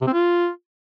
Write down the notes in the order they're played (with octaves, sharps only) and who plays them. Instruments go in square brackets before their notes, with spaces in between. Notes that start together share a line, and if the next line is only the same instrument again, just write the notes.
[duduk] C3
C4
F4